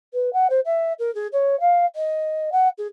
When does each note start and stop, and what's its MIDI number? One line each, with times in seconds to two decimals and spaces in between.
0.13 0.30 71
0.33 0.47 78
0.50 0.60 72
0.65 0.93 76
0.99 1.13 70
1.14 1.27 68
1.32 1.59 73
1.60 1.85 77
1.95 2.50 75
2.52 2.68 78
2.78 2.87 68